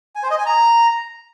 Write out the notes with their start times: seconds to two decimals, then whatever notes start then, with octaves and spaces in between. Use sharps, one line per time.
0.15 G#5
0.23 C5
0.31 D#5
0.38 G#5
0.46 A#5